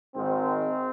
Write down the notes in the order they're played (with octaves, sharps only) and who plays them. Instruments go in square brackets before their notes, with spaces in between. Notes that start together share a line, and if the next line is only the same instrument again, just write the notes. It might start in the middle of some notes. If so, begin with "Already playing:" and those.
[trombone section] G#1 G#2 D#3 C4